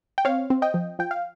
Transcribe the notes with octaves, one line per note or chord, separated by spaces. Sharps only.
G5
C4 C#5 F5
C4
D#5 G5
F3
F3 G5
F5